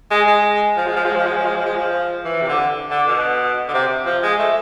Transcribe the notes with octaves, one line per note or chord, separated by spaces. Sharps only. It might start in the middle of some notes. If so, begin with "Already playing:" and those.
G#3
G#3
F3
G#3
F3
G#3
F3
G#3
F3
G#3
F3
G#3
F3
E3
C3
D3
D3
B2
D3
C3
F3
G#3
A3